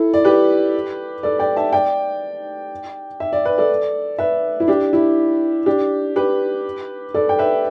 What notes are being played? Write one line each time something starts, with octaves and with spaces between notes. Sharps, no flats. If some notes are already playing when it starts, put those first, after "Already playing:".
Already playing: E4 A4
D5
G4 B4
A4 D5
D5 G5
E5 A5
D5 G5
E5
D5
B4
A4 D5
B4 E5
E4
D4 G4
E4
D4 G4
G4 B4
A4 D5
G5
B4 E5